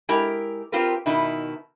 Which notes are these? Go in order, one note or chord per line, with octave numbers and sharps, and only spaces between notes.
G#3 E4 G4 A#4
C4 F4 G4 A#4 B4
B2 D#3 D#4 E4